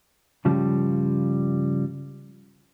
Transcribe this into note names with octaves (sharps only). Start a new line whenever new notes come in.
G2 C#3 F3 G3